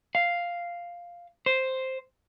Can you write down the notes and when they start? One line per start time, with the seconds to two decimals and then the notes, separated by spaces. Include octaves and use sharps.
0.15 F5
1.46 C5